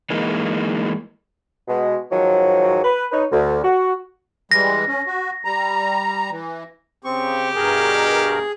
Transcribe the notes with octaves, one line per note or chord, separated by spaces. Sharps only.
E3 G#3 A#3 D#4
B2 G#3
G#2 D#3 F3 F#3
B4
D#4 B4 C#5
D2
F#4
E3 G3 G#3 A#6
C#4
F#4
G3 A#5
E3
C#3 C4 G4 C#6
G2 B2 G#4 A#4